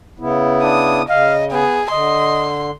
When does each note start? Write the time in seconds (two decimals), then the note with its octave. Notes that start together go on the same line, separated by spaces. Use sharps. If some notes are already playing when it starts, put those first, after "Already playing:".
0.19 C#3 B3 E4
0.63 D4 D#6
1.09 C#3 D#5 F5
1.52 B3 G#4
1.91 D3 D#5 C6